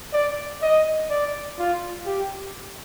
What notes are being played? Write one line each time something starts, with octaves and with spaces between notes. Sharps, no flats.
D5
D#5
D5
F4
G4